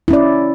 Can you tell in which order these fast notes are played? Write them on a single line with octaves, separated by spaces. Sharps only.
E4 C#4 D5